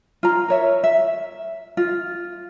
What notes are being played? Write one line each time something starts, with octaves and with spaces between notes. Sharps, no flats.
F4 A#5
A#4 C#5 E5
E5
F4